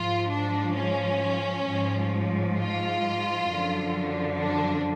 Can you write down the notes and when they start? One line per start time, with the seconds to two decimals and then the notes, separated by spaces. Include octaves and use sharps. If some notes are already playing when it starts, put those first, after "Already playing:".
Already playing: G#2 F3 F4
0.31 D4
0.76 C#4
1.67 G#2 F3
2.58 F4
3.48 F#2 D3 F3
4.39 D4